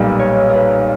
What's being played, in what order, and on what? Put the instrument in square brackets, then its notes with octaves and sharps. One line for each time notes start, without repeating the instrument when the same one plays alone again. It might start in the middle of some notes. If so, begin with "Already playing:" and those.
Already playing: [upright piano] B1 A#2 G3 [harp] B4
[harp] C#5
A#4
B4
A#4